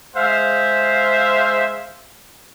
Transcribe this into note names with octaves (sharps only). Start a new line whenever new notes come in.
G#3 C5 E5 F5